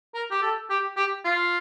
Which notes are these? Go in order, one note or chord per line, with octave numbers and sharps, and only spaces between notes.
A#4
G4
A4
G4
G4
F4